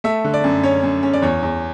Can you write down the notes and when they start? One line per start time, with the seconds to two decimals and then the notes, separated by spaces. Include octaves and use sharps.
0.04 A3 E5
0.24 D3
0.34 D5
0.44 F#2
0.64 C#4 C#5
0.83 F#2
1.03 C#4
1.13 D5
1.22 E2 C#5
1.43 E2